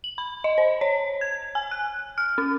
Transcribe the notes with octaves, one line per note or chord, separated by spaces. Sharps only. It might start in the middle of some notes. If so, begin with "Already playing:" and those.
F#7
B5
D#5
C5
C#5
G#6
G#5
F#6
F6
C#4